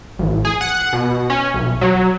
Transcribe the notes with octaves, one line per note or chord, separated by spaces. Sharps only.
A1
G#4
F#5
B2
C#4
B1
F#3